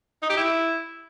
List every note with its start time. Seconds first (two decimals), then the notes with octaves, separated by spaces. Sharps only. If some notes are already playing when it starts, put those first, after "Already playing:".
0.22 D#4
0.30 G4
0.37 E4